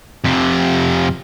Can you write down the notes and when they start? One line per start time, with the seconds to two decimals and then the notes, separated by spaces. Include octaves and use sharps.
0.24 F2 C3